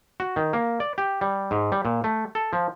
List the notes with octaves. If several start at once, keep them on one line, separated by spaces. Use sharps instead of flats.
F#4
D#3
A#3
D5
G4
G3
G#2
G3
A#2
A3
A4
F3